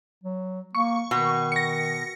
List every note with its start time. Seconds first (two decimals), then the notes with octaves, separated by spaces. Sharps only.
0.24 F#3
0.75 A#3 C#6
1.11 B2 D#3
1.52 A#6 C#7